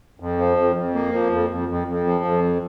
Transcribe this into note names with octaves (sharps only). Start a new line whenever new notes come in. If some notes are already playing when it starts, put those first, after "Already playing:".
F2
F3
F2
F2
A#3
F3
F2
F2
F2
F2
F3
F2